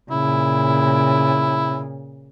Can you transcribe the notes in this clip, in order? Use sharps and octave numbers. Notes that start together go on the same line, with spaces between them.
A#2 C#3 E4